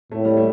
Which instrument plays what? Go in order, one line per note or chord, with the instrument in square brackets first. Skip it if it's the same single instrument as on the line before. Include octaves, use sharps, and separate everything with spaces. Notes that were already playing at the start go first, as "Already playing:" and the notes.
[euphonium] A2 [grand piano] A3
[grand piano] G3
A3